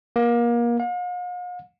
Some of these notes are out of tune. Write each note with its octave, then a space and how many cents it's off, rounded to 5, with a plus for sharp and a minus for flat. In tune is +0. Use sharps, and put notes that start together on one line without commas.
A#3 +30
F5 +45